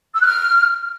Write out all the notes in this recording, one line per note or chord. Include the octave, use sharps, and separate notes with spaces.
E6
F#6
F6